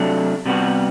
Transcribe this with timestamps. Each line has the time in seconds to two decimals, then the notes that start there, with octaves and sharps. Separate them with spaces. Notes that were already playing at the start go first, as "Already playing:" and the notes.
Already playing: C3 F#3 A3 D4
0.46 C3 G3 B3 F#4